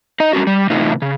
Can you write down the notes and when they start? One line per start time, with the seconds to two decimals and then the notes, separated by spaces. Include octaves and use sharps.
0.20 D#4 D#5
0.33 G3 A#3 C#4 F#4
0.47 G3
0.70 A2 C3 E3 D#4 F4
1.02 C#3